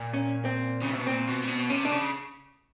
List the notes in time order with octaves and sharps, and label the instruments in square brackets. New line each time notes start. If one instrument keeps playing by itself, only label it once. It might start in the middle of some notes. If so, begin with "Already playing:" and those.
Already playing: [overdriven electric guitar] A#2
[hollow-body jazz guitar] C#4
C4
[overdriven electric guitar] C#3
C3
B2
[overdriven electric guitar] A#2 [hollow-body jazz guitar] C4
[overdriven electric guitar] B2
A#2
B2
[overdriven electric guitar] C3 [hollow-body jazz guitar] C#4
[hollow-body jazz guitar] D4
[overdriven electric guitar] C#3